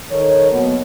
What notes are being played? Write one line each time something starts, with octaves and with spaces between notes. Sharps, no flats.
D#3 A4 C#5
B2 F#3 A#3 B3